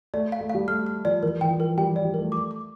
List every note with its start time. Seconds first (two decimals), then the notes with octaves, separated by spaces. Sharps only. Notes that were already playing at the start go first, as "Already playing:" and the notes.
0.14 A3 D5
0.32 F5
0.41 A3
0.49 F5
0.55 G3
0.68 A3 F6
0.86 F6
1.05 F3 D5
1.23 E3 A#4
1.41 E3 G5
1.51 F3
1.60 A#4
1.77 G3 G5
1.91 F3
1.96 D5
2.05 G3
2.14 A3 A#4
2.32 D6
2.51 D6